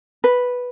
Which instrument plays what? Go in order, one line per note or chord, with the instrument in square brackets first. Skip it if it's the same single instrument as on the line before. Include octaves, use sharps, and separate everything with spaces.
[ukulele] B4